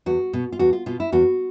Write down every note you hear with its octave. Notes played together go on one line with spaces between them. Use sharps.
E2 F#4
B2
F4
E2 F#4
F4
B2 F4
E4
E2 F#4